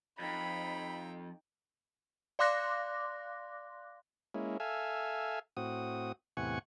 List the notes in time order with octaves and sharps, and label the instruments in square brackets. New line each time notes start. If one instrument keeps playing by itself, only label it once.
[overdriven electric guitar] F2 [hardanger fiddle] D#4 G5 [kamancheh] B5
[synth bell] D5 F5 C6 D6 F#6 A#6
[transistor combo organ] G#3 A#3 C#4 E4
A4 E5 F5 G#5
A2 C4 F#4 D#6
E2 A2 C3 F#5 G#5 C#6